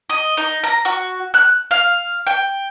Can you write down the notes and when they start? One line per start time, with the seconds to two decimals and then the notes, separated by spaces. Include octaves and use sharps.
0.10 D#5
0.37 D#4
0.64 A#5
0.85 F#4
1.34 F#6
1.71 F5
2.27 G5